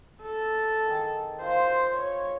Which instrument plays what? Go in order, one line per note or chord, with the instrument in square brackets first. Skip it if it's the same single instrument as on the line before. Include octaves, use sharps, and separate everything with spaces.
[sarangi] A4
[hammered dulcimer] D#3 G#4
[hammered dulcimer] F4 F5 [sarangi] C5
[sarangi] C#5